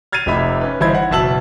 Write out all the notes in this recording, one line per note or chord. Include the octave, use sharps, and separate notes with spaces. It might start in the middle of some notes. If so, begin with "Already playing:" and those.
F6 G#6 A6 C7 D#7 F7
F1 C3 D#4 E5 B5
C#4 B4
G1 D#4 E4 C5 B5 G#6
F#5
F#1 B2 E5 A5 E6 F#7